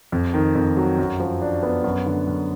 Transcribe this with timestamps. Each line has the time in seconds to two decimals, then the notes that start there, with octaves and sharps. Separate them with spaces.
0.12 F2
0.34 D#3
0.55 F2
0.77 F#3
0.98 F#2
1.20 F3
1.41 D4
1.63 B3
1.84 F#2
2.06 D3
2.28 F#2